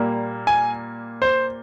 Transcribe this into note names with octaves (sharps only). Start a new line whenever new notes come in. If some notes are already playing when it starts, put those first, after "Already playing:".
Already playing: A#2 G3 A#3
G#5
C5